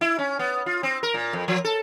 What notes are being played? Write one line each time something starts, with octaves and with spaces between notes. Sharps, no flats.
E4
C#4
B3
F4
C4
A#4
A#2
F2
F3
A4